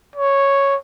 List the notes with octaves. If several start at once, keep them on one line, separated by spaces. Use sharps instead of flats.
C#5